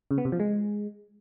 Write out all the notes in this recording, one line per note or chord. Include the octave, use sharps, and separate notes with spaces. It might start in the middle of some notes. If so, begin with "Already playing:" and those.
C#3
B3
C3
F3
G#3